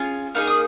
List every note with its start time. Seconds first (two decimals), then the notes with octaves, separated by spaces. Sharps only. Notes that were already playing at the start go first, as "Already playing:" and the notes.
Already playing: C#4 F4 G#4
0.35 A#3 D#4 G#4 F6
0.47 D#6